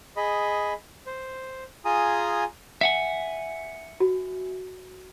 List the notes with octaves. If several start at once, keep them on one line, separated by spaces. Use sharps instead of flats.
G#4 D#5 B5
C5
F4 G#4 G#5 A#5 D#6
E5 F#5 G#5
F#4